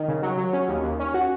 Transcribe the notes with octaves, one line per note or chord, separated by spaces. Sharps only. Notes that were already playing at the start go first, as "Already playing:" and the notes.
Already playing: D#3
C#3
F#3
F#3
C#4
D#2
D#2
C#4
F#4